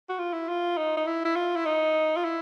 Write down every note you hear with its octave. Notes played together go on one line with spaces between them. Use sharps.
F#4
F4
E4
F4
D#4
D#4
E4
E4
F4
E4
D#4
F4
E4